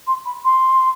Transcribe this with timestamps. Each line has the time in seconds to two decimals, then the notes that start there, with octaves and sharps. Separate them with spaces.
0.07 C6
0.25 B5
0.44 C6